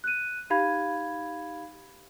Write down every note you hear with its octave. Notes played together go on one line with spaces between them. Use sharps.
F#6 D#7
D#4 G4 F5 B5 G#6